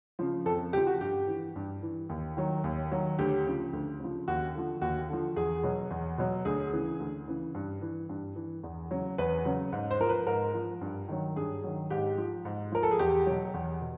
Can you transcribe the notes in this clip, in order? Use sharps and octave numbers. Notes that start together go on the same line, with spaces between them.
C#3 F3
F2 A4
C#3 F3 G4
F#4
G2 G4
E3
G2
E3
D#2
D#3 F#3
D#2
D#3 F#3
D2 G4
C#3 F3
D2
C#3 F3
D#2 F#4
D3 F3
D#2 F#4
D3 F3
E2 G#4
B2 F#3
E2
B2 F#3
D2 G#4
C#3 E3
D2
C#3 E3
G2
E3
G2
E3
E2
C#3 F#3
E2 B4
C#3 F#3
G#2
C5
F3 A#4
B4
G#2 A#4
F3
G2
D#3 F#3
G2 G#4
D#3 F#3
G#2 G4
F3
G#2
F3 A#4
A4
G#4
E2 G4
B2 F#3
E2
B2